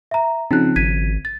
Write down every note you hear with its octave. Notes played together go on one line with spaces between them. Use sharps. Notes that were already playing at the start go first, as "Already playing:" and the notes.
E5 A#5
C#3 F3 C4 D#4 F#6
G#1 G#6 B6 D#7
A6